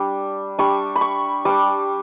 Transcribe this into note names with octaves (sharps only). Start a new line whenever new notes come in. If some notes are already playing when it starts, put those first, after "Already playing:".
Already playing: G3 D4
G3 D4 C#6
B5
C#6
G3 D4 D6